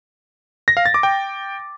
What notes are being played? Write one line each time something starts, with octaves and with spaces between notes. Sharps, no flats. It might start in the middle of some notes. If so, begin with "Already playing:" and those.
A#6
F5
A6
D6
G5